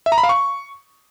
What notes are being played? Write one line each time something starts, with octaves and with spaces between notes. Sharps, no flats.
E5
A#5
B5
F5
C#6